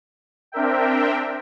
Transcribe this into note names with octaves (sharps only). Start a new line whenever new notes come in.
C4 D4 A#4 E5 G5